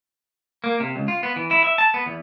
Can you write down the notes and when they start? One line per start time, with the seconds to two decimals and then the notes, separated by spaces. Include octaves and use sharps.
0.64 A#3
0.80 C3
0.96 C#2
1.08 F4
1.23 B3
1.36 E3
1.51 E4
1.64 E5
1.78 A5
1.94 B3
2.06 E2